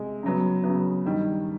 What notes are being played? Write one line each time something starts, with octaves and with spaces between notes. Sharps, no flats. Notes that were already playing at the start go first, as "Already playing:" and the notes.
Already playing: C3 G#3
C#3 F#3 B3
C#3 F#3 B3
G2 D#3 G3